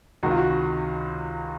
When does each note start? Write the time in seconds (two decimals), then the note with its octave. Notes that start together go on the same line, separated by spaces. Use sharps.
0.23 C#2 C3 D#3 F#4
0.31 F4
0.38 F#4